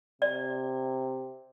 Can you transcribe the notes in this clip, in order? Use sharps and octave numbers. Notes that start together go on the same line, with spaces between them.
C3 D5